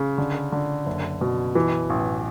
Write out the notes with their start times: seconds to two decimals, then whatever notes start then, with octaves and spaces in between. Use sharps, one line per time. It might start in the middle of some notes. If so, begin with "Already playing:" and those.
Already playing: C#3
0.18 D3
0.52 D3
0.86 F#1
1.21 B2
1.55 E3
1.90 A1